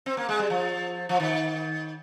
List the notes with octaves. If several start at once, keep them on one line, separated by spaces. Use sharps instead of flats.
C4
A#3
G#3
G3
F3
F3
D#3